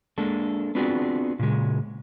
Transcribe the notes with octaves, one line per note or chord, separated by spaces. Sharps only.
G#3 A#3 D4 A4
B3 C4 D4 F4 F#4 G#4
A#2 C#3 G#3